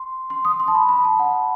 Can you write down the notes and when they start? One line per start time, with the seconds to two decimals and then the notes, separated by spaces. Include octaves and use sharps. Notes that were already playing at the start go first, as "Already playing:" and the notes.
Already playing: C6
0.30 C6
0.45 D#6
0.60 C6
0.68 A5
0.75 B5
0.89 B5
1.05 A5
1.19 F#5